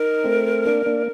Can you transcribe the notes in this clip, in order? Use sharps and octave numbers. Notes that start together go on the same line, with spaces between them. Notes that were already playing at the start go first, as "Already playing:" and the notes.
Already playing: D#4 A#4
A3 C4
A#3 D4
A#3 D4